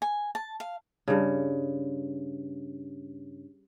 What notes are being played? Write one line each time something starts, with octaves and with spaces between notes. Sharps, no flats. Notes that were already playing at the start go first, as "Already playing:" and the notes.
G#5
A5
F5
G2 C#3